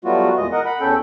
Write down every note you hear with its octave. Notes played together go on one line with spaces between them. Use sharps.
F#3 G3 A3 B3 F4 F#4
E2 A#2 G#3 D#5
A#4 D#5 F#5
F#5 B5
E2 C#4 A4 G5